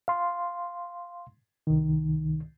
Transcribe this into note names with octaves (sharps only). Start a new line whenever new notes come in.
F5 C6
C2 D#3